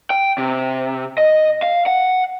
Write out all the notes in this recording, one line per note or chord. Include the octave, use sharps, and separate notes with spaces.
G5
C3
D#5
F5
F#5